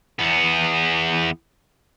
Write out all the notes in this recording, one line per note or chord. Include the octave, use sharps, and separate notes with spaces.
E2 B3